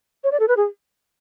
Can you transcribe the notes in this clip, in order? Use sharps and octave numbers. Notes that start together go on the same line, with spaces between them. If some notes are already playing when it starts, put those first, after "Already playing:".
C#5
D5
A4
B4
G#4